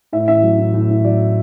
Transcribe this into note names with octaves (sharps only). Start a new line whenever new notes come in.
A2 E5
A1 E5
F#3
A1
A2
A1
F#3 D5